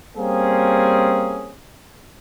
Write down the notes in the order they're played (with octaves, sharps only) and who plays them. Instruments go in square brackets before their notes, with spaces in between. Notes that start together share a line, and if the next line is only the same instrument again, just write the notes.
[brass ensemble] G3 A#3 C4 C#4 G#4